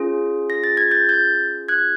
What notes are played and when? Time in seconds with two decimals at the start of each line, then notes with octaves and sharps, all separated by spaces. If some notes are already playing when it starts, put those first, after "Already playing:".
Already playing: C#4 F4 G#4
0.50 A#6
0.64 A6
0.77 G#6
0.91 G6 A6
1.09 G6 A6
1.68 F#6 G#6